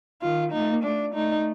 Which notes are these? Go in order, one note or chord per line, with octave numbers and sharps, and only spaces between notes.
D#3 F4
A#3 D#4
A3 D4
A3 D#4